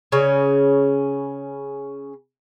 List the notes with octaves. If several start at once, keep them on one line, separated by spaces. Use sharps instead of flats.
C#3 C#4